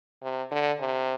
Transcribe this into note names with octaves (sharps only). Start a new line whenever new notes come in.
C3
D3
C3